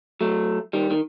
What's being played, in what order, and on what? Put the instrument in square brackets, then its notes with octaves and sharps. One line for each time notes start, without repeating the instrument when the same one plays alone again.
[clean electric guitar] F#3 A3
D#3 G3
D#3